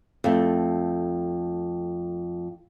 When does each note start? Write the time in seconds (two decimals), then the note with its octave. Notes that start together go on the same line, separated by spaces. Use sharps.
0.24 F2 A3